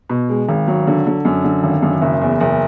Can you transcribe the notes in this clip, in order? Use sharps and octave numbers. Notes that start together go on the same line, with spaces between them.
B2
G#3
G#1
F#3
D3
D3
F#2
D3
G#1
F#2
F#1
E2
F#1